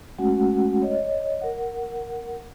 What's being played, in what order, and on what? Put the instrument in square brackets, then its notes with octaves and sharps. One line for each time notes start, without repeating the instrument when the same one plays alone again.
[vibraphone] G#3 A3 C#4 F#4 F#5
C#5 D#5
A#4 F#5